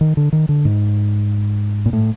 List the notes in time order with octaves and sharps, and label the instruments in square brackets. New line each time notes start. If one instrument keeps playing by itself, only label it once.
[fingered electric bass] D#3
D3
D#3
D3
G#2
A#2
A2